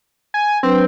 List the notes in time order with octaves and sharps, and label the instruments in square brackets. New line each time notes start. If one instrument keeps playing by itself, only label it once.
[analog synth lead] G#5
[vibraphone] F#3 D4 B4 [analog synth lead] C4